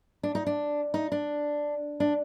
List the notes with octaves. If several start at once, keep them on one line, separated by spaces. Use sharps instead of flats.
D4
D#4
D4
D#4
D4
D4